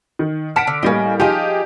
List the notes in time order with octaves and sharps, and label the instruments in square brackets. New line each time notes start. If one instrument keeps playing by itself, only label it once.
[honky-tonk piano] D#3
[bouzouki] F#5 A5 [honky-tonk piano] F6 B6 D7
[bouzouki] D3
[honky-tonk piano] A2 G3 A#3 [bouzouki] C#4 D#5
[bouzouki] F3 G#4 D#5 [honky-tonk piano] D#4 F4 G4